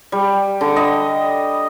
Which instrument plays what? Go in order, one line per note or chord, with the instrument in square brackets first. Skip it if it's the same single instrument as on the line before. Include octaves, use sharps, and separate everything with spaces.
[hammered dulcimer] G3
D3
D#5